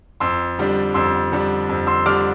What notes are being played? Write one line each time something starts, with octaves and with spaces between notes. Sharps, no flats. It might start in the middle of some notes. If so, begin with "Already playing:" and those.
F2 C6 E6
D3 G3 D4
F2 C6 E6
D3 G3 D4
F2
C6 E6
D3 G3 D4 D6 F6